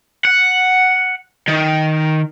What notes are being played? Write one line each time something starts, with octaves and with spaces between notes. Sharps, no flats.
F#5
D#3